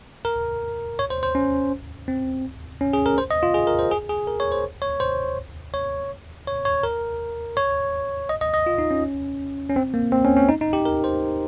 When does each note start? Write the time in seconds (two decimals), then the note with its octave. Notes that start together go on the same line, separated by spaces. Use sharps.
0.25 A#4
0.99 C#5
1.10 C5
1.23 C5
1.35 C#4
2.08 C4
2.81 C#4
2.93 G#4
3.06 A#4
3.18 C5
3.31 D#5
3.43 F4
3.54 G#4
3.67 A#4
3.79 C5
3.91 G#4
4.09 G#4
4.27 A#4
4.40 C#5
4.52 C5
4.82 C#5
5.00 C5
5.74 C#5
6.47 C#5
6.65 C#5
6.83 A#4
7.57 C#5
8.29 D#5
8.41 D#5
8.54 D#5
8.67 F4
8.78 D#4
8.91 C#4
9.70 C#4
9.76 C4
9.94 A#3
10.12 C4
10.25 C#4
10.37 C#4
10.49 D#4
10.61 D#4
10.73 G4
10.85 A#4
11.04 C5